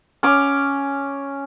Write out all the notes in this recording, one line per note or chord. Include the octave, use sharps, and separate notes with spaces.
C#4 D6